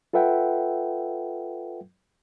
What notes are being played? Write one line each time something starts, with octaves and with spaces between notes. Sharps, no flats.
F4 A4 B4 E5 F#5 G5